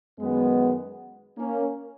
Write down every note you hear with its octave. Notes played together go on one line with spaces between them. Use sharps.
F#2 D#3 G#3 B3
A#3 C#4